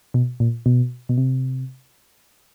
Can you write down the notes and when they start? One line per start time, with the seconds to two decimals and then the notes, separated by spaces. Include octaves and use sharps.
0.14 B2
0.40 A#2
0.66 B2
1.09 B2
1.18 C3